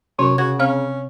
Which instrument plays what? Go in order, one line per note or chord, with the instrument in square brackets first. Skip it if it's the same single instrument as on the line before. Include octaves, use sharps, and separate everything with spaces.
[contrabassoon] F#2 [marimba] C3 [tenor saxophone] C#5
[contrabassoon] C#3 [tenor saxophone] F#4 [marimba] G#6
[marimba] C4 F5 F6 [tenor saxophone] C#4